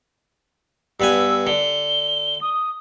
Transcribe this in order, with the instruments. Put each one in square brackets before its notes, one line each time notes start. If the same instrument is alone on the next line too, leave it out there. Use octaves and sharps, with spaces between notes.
[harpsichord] G2 B3 G#5 [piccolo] E6
[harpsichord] D3 [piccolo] G7
[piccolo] D#6